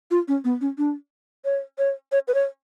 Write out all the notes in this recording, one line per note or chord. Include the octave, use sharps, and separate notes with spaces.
F4
C#4
B3
C#4
D4
C#5
C#5
C#5
B4
C#5